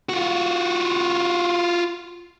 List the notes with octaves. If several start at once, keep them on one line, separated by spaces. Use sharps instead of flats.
F4 F#4